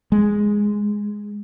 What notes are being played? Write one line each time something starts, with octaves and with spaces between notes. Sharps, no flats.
G#3